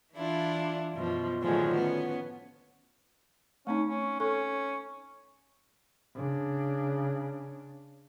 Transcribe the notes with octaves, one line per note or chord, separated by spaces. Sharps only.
E3 D4 E4 F4
F#2 B2 F3
A2 D3 D#3 F3 F#3 G#3
B3 C#4
A3 C4 C#4 D#4
C#4
C#4 A4
C#3 D4